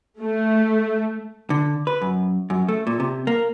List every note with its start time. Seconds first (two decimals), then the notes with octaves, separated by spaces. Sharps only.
0.19 A3
1.50 D3
1.87 B4
2.02 F#2
2.50 F#2
2.69 A3
2.87 A#2
3.00 C3
3.27 A#3